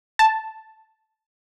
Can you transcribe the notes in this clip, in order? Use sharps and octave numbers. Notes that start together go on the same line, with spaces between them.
A5